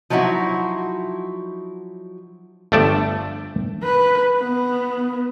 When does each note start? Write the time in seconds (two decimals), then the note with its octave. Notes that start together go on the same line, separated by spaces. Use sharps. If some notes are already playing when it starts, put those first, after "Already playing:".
0.10 F3 F#3 D#4 E4 F#4
2.72 G1 F3 A3 D5 G5 A5
3.83 B4
4.37 B3